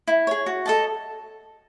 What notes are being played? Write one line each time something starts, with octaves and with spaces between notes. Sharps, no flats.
E4
G#4 C#5
F#4
A4 D#5 A5